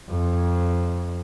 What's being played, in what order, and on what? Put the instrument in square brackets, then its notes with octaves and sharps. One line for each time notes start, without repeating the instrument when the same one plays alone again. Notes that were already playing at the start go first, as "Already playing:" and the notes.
[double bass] F2